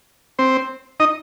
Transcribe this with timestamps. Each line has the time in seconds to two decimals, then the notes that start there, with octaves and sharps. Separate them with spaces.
0.39 C4 C5
1.00 D#4 D#5